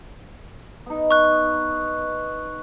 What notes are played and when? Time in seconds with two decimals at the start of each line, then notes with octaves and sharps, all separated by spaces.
0.86 B3 D#4
1.11 C#6 F#6